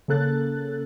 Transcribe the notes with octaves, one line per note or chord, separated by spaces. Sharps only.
C#3 A#3 A4 F#6 A6